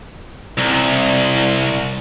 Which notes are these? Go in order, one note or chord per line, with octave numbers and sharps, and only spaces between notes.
C2